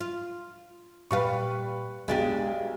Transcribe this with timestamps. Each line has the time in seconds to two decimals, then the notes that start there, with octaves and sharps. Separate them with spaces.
0.01 F4
1.11 A#2 G3 B4 F5 C#6
2.08 B1 G#3 D4 G4 A6